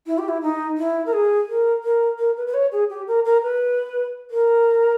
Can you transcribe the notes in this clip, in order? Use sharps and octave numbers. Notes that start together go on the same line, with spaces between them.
E4
G4
E4
D#4
E4
A#4
G#4
A#4
A#4
A#4
B4
B4
C#5
G#4
G4
A#4
A#4
B4
A#4